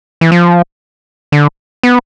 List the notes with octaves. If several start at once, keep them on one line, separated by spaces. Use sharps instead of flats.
E3
F3
D3
B3